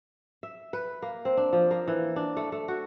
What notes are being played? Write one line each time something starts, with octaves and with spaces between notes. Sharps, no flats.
E5
B4
A#3
C4
D4
F3
A#3
E3
D4
A3
A3
F#4